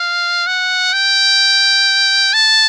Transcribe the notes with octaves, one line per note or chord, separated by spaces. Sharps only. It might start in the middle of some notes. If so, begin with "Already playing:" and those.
Already playing: F5
F#5
G5
A5